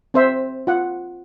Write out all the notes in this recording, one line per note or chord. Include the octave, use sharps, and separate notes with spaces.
C4 C5 E5
F4 F#5